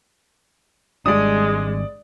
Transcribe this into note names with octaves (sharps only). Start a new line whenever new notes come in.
G#1 G3 G#3 D4 D5 D#6